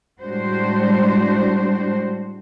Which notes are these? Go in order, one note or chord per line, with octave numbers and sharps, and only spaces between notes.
A2 G3 G#3 D4 F#4 C5